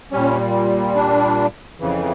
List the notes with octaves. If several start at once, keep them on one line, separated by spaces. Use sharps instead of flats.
A#2 G3 C#4
D4
F2 C#3 E3